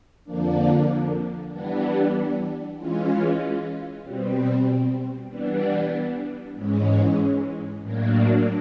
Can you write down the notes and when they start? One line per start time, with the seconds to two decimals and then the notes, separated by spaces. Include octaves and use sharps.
0.24 F2 D3 F3 A#3 D4
1.50 E3 G3 B3 D4
2.77 E3 G#3 C#4 F4
4.03 B2 G3 C4
5.29 E3 G3 B3 D4
6.55 G#2 E3 G#3 C#4
7.81 A2 F#3 A#3 D4